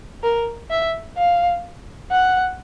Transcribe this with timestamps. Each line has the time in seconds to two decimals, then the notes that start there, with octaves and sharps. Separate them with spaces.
0.23 A#4
0.71 E5
1.18 F5
2.11 F#5